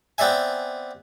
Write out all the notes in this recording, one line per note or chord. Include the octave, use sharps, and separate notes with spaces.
B3 C4 D5 E5 G#5